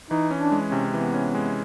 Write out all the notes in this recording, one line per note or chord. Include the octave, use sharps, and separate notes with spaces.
E3 D#4
C#4
D4
G#3
C#4
C3
E3 B3
C#4
G#3